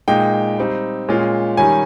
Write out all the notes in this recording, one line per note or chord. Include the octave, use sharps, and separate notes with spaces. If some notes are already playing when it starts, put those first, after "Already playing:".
A#2 G#3 D#4 G5
G3 C4 D#4
A#2 G#3 C#4 F4
D#3 G3 C#4 G#5